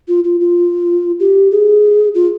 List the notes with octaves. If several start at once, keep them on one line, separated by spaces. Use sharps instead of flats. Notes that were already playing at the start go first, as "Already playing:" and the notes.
F4
F4
F4
G4
G#4
F4